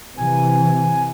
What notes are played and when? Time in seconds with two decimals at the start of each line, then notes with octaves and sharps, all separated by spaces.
0.17 C3 E3 G#5